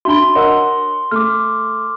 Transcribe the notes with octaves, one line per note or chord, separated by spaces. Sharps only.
D4 F#4 E5 B5 C6 G7
A#4 C#5 D#5 F#5 E6
A3 D6 F6